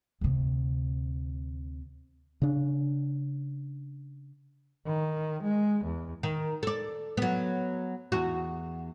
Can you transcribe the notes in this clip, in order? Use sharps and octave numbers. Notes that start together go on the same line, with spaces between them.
D2 C3
C#3 D4
D#3
G#3
E2
D#3
A4 D5
F#3 B3
E2 F#4